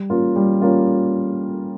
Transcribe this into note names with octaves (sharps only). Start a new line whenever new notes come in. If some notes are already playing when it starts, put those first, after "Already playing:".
Already playing: G3
A#3 C#4 F4
G3
A#3 C#4 F4